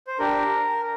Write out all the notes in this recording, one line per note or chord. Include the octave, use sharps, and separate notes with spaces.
C5
D4 G4 A#4